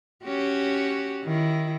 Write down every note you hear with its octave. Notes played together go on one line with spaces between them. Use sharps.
C#4 F#4 G4
D#3 E4